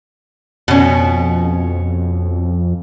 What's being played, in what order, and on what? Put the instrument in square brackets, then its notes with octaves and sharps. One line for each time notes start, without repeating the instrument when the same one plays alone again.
[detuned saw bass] F2 [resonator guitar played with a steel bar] B2 C#4